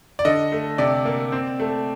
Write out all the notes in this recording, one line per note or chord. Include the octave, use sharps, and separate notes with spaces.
D5
D3 D#5
A3
C3 D5
A#3
C4
A3